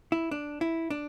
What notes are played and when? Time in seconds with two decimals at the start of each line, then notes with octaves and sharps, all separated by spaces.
0.12 E4
0.31 D4
0.61 E4
0.90 D4